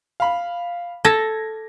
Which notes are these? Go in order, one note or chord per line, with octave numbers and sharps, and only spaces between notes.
F5 B5
A4 G#6 A#6